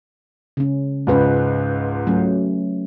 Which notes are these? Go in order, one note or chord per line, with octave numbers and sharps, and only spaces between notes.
C#3 C#4
C#2 G#2 F4 B4
F#3 A3 C#4